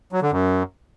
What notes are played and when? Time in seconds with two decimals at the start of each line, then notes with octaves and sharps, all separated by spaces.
0.12 F#3
0.22 D3
0.32 F#2